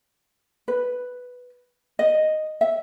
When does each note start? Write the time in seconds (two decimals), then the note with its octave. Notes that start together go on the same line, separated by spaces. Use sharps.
0.68 B4
1.99 D#5
2.61 E5